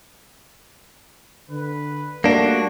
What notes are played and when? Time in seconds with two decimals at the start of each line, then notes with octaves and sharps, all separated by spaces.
1.50 D3 B4
2.24 G3 A3 A#3 D4 F#4